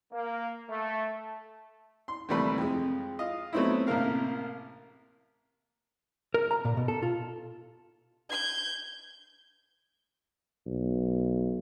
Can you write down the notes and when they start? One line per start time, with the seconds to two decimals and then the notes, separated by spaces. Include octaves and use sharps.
0.13 A#3
0.70 A3
2.08 C6
2.29 D#2 C3 E3 G3 A3 B4
2.58 F2 G#3
3.19 F4 D#5
3.53 F#3 A3 B3 C4 D#4 E4
3.87 A1 C3 A#3 A#4 F5
6.34 A#4
6.51 A#5
6.65 A#2
6.77 B2
6.88 A4
7.02 F4
8.30 G6 G#6
10.66 B1